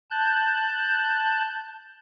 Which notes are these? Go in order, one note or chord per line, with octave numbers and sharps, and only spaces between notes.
A5 F#6 G6